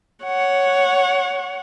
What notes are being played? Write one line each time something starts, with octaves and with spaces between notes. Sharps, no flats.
C#5 F#5